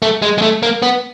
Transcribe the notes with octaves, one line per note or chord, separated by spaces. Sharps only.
A3
G#3
G#3
A3
A#3
B3